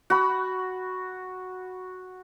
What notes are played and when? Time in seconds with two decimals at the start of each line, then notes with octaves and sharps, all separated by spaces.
0.10 F#4 B5